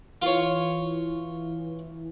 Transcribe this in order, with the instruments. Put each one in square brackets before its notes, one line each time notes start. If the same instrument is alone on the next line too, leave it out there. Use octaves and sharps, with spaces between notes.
[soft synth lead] E3 [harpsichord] F4 C#5